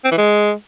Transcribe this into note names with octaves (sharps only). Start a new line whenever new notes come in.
C4
E3
G#3